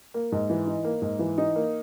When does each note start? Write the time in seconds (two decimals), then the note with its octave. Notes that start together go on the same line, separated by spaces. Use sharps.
0.14 A#3
0.32 G#2
0.50 E3
0.67 D#4
0.85 A#3
1.02 G#2
1.19 E3
1.38 D#4
1.56 A#3